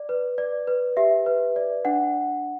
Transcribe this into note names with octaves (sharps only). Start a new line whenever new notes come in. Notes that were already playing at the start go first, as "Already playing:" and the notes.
Already playing: D5
B4
D5
B4
G4 E5
B4
D5
D4 F#5